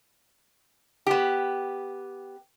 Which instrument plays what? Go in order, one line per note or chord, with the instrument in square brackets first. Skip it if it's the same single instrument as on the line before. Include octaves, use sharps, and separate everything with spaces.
[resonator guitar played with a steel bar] B3 G4